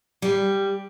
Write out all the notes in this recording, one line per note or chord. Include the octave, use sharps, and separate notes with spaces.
G3